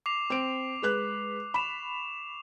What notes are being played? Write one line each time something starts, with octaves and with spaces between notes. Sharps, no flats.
D6 C7 F7
C4 D7
G#3 B4 F#6
B5 C#6 E7 F7